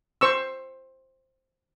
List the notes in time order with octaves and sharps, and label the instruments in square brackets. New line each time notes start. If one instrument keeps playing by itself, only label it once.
[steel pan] C5 C#6 E6